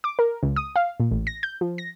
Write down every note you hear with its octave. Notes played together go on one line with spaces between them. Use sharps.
D6
A#4
C#2
D#6
F5
A#2
A1
A#6
G6
F3
A#6